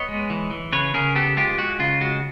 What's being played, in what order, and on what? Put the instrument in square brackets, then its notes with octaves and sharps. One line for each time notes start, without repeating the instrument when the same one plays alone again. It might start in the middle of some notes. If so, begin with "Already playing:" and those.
Already playing: [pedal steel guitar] B3 C#5 D#5
G#3
E3
E3
C#3 B4 C#5
C#3 G#4 A#4
B3 G4 A4
G#3 F4 G4
G#3 F#4
C#3 F4
G#3 F#4